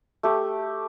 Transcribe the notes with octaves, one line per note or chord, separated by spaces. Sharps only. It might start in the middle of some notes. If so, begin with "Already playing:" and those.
A3 G4